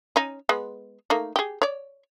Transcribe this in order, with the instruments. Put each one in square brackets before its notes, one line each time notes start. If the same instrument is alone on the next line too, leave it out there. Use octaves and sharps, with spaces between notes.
[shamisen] C#4 D#4
G#3 B3
A3 A#3 D#4
G4 G#4
C#5 D5